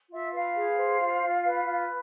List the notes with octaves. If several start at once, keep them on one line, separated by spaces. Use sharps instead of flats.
F4 E5
B4 F5
G#4
C5
F4
F4
B4
F4